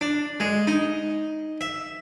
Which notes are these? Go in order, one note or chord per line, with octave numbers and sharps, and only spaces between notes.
D4
G#3
D#4
E5